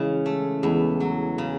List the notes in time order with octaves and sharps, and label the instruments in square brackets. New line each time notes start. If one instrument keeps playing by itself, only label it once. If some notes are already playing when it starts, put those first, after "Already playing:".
Already playing: [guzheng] C#3 [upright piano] E3 G#3
[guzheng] A3
[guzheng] E2 [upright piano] G#3 B3
[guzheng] F#3
C#3